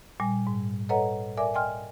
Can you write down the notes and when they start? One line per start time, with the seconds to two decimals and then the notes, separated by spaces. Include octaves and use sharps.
0.20 A#2 G3 G#5
0.47 G#2
0.89 A4 B4 C#5 D#5 F#5 A#5
1.37 A#4 D5 E5 G#5 D6
1.54 D#5 G5 G#5 C6 F6